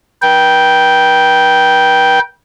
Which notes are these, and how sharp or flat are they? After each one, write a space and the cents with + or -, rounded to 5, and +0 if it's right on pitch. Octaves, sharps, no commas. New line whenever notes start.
B4 -40 G5 -5